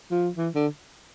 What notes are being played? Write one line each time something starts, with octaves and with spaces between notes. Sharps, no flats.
F3
E3
D3